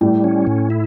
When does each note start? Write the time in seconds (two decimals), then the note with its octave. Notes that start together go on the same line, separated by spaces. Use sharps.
0.01 A2 G3
0.24 C#4
0.47 A2
0.70 E4